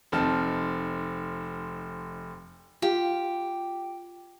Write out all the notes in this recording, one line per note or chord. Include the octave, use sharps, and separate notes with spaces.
F1 C4 D#4 A5 F6
F4 G4